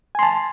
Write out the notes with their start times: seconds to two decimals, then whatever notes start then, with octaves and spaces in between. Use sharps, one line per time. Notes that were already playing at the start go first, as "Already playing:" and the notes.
0.15 G#5
0.19 C6
0.23 A5